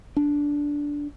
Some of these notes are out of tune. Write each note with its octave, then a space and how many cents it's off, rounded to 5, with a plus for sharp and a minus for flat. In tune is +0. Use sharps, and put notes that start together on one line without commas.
D4 -10